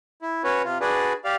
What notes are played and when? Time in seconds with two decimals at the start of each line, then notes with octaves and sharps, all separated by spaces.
0.22 E4
0.44 C#4 F#4 B4 C#5
0.64 C3 F4
0.81 D4 F#4 G#4 B4 D5
1.25 G4 D5 F5